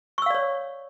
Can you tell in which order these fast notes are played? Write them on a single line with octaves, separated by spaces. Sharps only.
C#6 E6 F5 D5 C#5